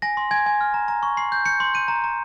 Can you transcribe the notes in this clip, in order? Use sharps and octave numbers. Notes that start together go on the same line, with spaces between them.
G#5 A#6
C6
G#5 G#6
G#5
F6
A#5
A#5
C#6
C6 C7
G6
G6 C#7
C6
G6 D#7
A#5
A#5